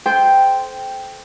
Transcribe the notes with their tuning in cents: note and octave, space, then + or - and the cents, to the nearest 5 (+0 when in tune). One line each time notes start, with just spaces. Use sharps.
A4 -30 C5 -10 G5 +0